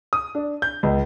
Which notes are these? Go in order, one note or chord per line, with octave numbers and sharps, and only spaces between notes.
D#6
D4
G6
C#2